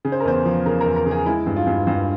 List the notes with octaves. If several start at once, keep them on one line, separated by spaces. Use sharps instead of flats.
C#3
C5
A#4
E2 C5
F3
C#3 A#4
A#4
E2
A#4
C#3
G#4
G#3 E4
G2
F4
G2
G2